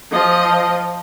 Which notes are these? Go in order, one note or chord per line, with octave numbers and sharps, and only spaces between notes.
F3 D#5